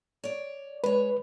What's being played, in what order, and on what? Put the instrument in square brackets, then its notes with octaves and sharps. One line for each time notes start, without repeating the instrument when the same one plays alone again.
[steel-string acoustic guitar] C#5 D5
[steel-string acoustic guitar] G#3 C#5 [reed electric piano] B4